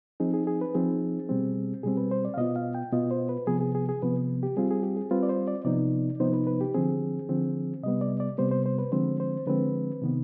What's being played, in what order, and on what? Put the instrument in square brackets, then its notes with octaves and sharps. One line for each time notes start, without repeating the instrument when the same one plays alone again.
[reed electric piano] F3 C4 D#4 G#4
G#4
G#4
B4
F3 C4 D#4 G#4
B2 G3 C4
B2 G3 C4 G#4
B4
C5
D5
F5
B2 B3 F4 D#5
F5
G5
B2 B3 F4 D#5
C5
B4
C3 F3 B3 G#4
G#4
G#4
G#4
C3 F3 B3 B4
G4
G3 C4 F4 G#4
G#4
G4
G#4
G3 C4 F4 B4
D5
C5
D5
C3 F3 B3 D#4 D5
C3 F3 B3 D#4 C5
B4
B4
G4
D3 F3 C4 G#4
D3 F3 C4
C3 G3 B3 D#5
D5
D5
C3 G3 B3 C5
C5
C5
B4
D3 F3 G#3 C4 C5
C5
D3 F3 G#3 C4 B4
C3 D#3 B3